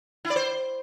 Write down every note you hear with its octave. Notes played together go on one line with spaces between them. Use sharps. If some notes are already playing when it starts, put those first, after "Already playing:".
E4
D5
C5